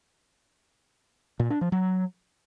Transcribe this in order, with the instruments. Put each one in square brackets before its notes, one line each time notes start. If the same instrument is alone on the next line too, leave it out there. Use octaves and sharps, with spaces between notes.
[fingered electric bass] A#2
D4
F3
F#3